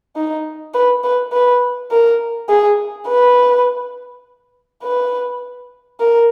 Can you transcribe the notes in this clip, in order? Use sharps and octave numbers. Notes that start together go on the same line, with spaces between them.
D#4
B4
B4
B4
A#4
G#4
B4
B4
A#4